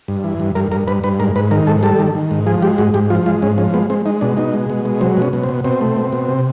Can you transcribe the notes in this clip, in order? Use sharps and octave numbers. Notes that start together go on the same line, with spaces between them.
G2
E3
G2
G2 A#4
G2 A#4
G2 B4
G2 B4
G#2 A#4
G#2 B4
D#3 A#4
G#2 A4
G3 A4
D#3
D#3
G#2
F3 G#4
G#3 G4
G#2 F#4
G#2 G4
F3 F4
G#3 F4
G#2 C#4
F3 C#4
G#3 B3
G#3 C4
G#3 D#4
B2 D4
B2 D#4
G#3
B2
G#3
F#3 C4
B2 C#4
B2
C4
B2
B2 C4
A3
B2
B2
C3